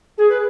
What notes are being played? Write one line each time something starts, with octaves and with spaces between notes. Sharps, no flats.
G#4
B4